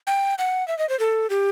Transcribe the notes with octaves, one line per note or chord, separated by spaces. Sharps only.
G5
F#5
E5
D#5
C5
A4
G4